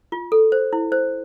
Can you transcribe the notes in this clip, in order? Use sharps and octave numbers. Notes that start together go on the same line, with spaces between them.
F4
A4
C5
E4
C5